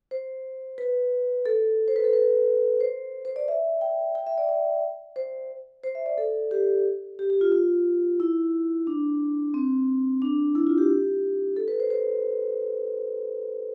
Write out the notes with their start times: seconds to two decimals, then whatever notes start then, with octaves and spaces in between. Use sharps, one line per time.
0.11 C5
0.78 B4
1.46 A4
1.88 C5
1.96 B4
2.04 A4
2.13 B4
2.80 C5
3.25 C5
3.36 D5
3.48 E5
3.81 G5
4.15 G5
4.27 E5
4.38 D5
4.49 D5
5.16 C5
5.84 C5
5.95 E5
6.06 D5
6.18 A4
6.51 G4
7.19 G4
7.30 G4
7.41 F4
7.52 F4
8.20 E4
8.87 D4
9.54 C4
10.22 D4
10.55 E4
10.67 F4
10.78 G4
11.57 A4
11.68 B4
11.80 C5
11.90 C5